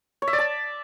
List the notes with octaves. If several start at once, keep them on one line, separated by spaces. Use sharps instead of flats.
C#5
E5
D5
A5